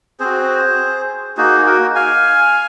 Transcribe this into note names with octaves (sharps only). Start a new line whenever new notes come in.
C4 F#4 G#4 C5
A#3 D#4 F#4 G#4
F#4 A#4
F5 G#5